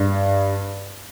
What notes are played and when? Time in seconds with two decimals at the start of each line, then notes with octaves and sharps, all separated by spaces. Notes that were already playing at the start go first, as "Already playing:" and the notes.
Already playing: G2